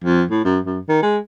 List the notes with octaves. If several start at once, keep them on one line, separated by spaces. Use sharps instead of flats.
F2
A2
F#2
F#2
D#3
G#3